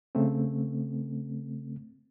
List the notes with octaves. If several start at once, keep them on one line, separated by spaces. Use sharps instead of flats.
C#3 A3 C4